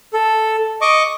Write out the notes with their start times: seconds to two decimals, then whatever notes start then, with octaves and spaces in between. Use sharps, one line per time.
0.13 A4
0.81 D#5 C#6 D6